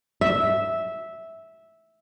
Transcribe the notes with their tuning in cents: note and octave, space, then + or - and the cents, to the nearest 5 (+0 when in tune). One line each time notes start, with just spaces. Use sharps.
E5 -10